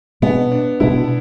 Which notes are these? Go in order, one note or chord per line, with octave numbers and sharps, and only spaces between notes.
B2 G#3 B3 D4
D4
B2 G#3 D4 E4